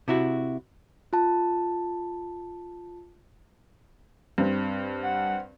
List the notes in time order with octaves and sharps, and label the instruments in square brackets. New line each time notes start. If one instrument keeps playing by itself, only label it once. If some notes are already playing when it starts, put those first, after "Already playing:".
[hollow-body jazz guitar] C3 E4 F#4
[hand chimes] F4 A5
[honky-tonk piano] G2 [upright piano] C4
[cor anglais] F#5